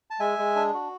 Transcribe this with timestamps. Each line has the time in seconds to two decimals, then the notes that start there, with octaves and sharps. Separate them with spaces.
0.10 A5
0.20 G#3 E5 G#5
0.39 G#3
0.56 D4
0.74 F#4